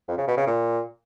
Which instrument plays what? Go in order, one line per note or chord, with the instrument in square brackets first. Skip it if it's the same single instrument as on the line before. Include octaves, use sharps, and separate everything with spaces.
[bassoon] F2
C#3
B2
C#3
A#2